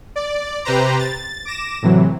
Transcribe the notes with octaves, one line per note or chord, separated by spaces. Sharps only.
D5
C3 G4 B4 C5 A#5
A6
D6 A#6 E7
A2 C3 E3 F#3